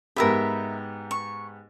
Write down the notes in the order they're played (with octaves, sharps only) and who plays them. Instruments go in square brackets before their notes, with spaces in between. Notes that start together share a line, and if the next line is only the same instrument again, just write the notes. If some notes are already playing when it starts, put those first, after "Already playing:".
[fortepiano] G#2 B3 G4 [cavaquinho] A#4 E5 B5
[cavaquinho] C#6